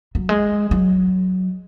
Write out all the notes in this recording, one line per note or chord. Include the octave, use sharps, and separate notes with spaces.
F#3
G#3
F#3